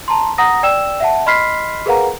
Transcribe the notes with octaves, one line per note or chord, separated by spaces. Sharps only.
A5 A#5 C6
F#5 A#5 D#6 A#6
D5 G5 E6 E7
E5 F#5 A5
D#5 B5 C6 F6 B6 C7
G#4 A#4 B4 F5 F#5 A#5